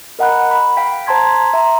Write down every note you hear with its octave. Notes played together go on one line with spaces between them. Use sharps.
A#4 D#5 F#5 A#5 B5 F#6
B5
F5 G5 B6
C5 A5 A#5 C6 G#6 B6
E5 A#5 C6